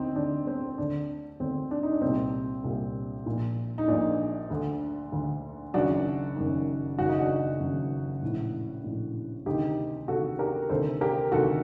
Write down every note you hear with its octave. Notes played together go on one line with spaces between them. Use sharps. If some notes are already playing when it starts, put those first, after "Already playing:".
Already playing: D2 D3 C4 D#4
D2 D3 D4
C4
D2 D3 D4
D2 D3 C4
D4
D#4
D4
C2 A#2 C4
C2 A#2
A#1 A#2
D#4
A#1 A#2 D4
D2 D3
D2 D3
F#1 F#2 D#3 D4 F#4
F#1 F#2 D#3
F#1 F#2 D#3 F#4
D#4
D4 F#4
F#1 F#2 D#3
A#1 A2
A#1 A2
D2 C3 D#3 D#4 G4
D2 C3 D#3 F#4 A4
G4 A#4
D2 C3 D#3 A4 C5
G4 A#4
D2 C3 D#3 F#4 A4